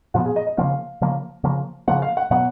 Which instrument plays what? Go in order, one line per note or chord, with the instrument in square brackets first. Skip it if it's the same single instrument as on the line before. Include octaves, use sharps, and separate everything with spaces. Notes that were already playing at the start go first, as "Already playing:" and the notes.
[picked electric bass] A#2 F3 B3 [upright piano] F#4
[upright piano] G#4
D#5
D#5
[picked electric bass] C#3 F3 A#3 [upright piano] F5
[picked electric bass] C#3 F3 A#3
C#3 F3 A#3
[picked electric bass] C#3 F3 A#3 [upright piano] F#5
[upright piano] F5
F#5
[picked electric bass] B2 F#3 B3 [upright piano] F#5